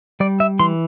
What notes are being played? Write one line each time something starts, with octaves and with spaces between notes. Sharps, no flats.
G3 D5
E5
E3 C6